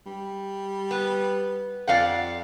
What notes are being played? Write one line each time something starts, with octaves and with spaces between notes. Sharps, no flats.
G3
B3
F2 D5 F5 F#5